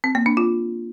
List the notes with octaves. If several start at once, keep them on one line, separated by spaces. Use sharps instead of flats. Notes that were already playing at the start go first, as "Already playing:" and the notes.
C4
A#3
D4
F4